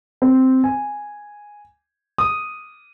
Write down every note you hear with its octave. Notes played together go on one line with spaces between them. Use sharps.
C4
G#5
D#6